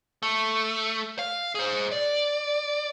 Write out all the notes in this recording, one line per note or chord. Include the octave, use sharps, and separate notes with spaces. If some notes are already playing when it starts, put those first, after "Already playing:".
A3
F5
G#4 C5
D5